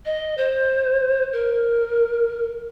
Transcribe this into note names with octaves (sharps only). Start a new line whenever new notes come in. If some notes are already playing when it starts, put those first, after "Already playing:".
D#5
C5
A#4